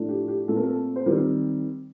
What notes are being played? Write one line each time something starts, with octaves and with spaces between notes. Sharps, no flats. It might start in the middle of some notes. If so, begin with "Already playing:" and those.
Already playing: A2 F3 A3 D4
G4
G4
A#2 A3 C4 A4
A#4
A4
C5
D#3 G3 C4 G4 A#4